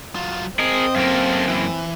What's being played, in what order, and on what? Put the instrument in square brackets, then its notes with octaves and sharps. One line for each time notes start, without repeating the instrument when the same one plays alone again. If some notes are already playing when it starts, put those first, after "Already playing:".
[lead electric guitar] F#3 F4
[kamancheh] C4 [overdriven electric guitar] G#4 A#4 [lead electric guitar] D#5
[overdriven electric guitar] F#2 A#3 [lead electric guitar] A4 F5
[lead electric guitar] E3